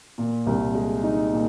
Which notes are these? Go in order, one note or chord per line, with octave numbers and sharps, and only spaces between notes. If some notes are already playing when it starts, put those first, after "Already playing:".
A#2
C2
G#3
D#4
A#2